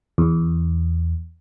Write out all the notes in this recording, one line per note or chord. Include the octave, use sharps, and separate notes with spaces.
E2